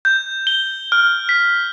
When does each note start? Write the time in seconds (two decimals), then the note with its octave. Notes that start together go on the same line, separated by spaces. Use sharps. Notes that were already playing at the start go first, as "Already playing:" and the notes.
0.05 G6
0.47 G7
0.92 F6
1.29 B6